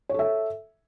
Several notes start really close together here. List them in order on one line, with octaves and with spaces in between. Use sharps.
C#5 A4 E5